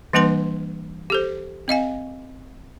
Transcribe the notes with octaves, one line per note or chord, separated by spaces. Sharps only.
E3 G3 A#3 D4 B4 C6
G4 A4 C5
C4 D#5 F5 G#5